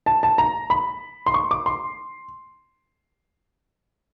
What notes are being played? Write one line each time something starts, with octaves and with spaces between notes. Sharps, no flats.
A5
A5
A#5
B5
C6
C#6
D6
C6